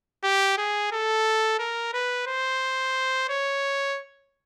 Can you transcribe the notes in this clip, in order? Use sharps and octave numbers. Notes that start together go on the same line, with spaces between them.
G4
G#4
A4
A#4
B4
C5
C#5